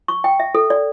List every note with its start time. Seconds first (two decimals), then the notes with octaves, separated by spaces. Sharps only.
0.08 C#6
0.24 G5
0.40 E5
0.55 A4
0.70 D5